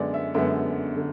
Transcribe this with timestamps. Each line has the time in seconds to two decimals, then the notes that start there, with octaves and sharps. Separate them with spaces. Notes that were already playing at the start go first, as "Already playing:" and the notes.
Already playing: F#2 D3 G#3 B3 D5
0.14 E5
0.34 F#2 D3 G#3 B3 E5
0.96 D3